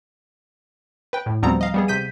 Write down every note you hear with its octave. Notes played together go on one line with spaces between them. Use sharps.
B4 G5
A2
D2 F3 G3 B3 C4 A#5
D#5 F5
G3 B3 G#4
C3 G6 B6 D#7